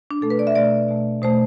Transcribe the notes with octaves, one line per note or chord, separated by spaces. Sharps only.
D4
B2 A3 A4
B4
D5
E5
B2 A3 D5
B2 A3
B2 A3 C5